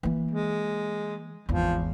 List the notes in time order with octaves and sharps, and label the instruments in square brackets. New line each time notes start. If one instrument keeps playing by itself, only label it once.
[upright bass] E3 A#3
[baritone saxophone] G#3
[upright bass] G#1 E2 [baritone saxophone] F3